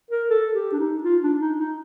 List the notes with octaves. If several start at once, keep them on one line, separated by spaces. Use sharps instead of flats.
A#4
A4
G4
D4
D#4
F4
D4
D#4
D#4